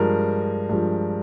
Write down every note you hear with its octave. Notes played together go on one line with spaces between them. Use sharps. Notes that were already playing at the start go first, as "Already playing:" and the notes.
Already playing: G2 F3 G#3 A#4
G2 F3 G#3